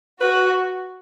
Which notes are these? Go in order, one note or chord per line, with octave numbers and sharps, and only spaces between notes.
F#4 B4